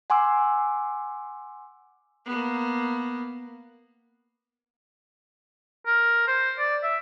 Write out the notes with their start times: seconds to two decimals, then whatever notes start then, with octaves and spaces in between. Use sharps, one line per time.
0.10 F#5 G#5 C6 D6 E6
2.25 A#3 B3
5.87 A#4
6.28 C5
6.58 D5
6.83 E5